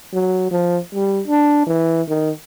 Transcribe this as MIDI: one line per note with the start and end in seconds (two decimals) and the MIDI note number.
0.13 0.47 54
0.51 0.78 53
0.94 1.21 55
1.27 1.66 62
1.67 2.02 52
2.09 2.31 51